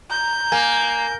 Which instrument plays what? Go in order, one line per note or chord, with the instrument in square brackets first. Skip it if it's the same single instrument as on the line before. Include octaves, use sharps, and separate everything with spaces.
[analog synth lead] A#5 [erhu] G6
[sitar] A#3 [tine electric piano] G#5